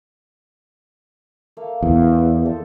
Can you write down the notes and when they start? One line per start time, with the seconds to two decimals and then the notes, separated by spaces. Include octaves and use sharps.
1.57 A3 A#3 F5
1.83 E2
2.46 A4 C5